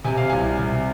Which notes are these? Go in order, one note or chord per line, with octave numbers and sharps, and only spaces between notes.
C3 G#5
F5
C2 G#5
C3